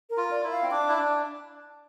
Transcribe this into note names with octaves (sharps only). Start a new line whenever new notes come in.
A#4
F4
D5
E4
F5
C4
D4 D6
E4
D4